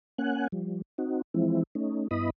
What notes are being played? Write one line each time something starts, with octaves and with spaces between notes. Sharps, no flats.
A#3 C#4 F#5 G#5 F#6
F3 G3
C4 D#4 F#4
E3 F3 G#3 C4 E4
A3 C#4 D#4
G2 B3 E4 D#5 B5 D#6